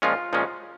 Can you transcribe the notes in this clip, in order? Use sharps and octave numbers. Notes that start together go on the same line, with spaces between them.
A#2 F3 G#3 C#4 F4
A#2 F3 G#3 C#4